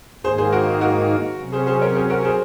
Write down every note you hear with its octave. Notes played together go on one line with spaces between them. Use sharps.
G#2 D#3 A#3 G#4 C5
G#4 C5
F#4 A#4
F#4 A#4
C3 F#3 C#4
G#4 C5
G#4 C5
A#4 C#5
G#4 C5
F#4 A#4
G#4 C5